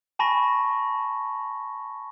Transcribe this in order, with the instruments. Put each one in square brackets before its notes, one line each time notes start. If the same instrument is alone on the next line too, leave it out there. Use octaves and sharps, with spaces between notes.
[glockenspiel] G#5 A5 B5 C#6 A#6